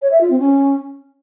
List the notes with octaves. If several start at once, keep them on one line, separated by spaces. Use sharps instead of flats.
C#5
E5
F4
C4
C#4